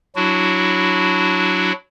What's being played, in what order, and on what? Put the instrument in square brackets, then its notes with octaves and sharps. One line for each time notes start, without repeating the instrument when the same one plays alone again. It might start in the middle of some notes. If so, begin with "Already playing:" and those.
[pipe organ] F#3 D4 E4 F#4